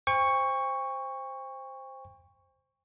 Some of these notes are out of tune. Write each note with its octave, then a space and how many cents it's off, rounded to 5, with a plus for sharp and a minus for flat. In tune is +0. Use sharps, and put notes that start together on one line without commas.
C5 +0 G5 +40 C#6 +0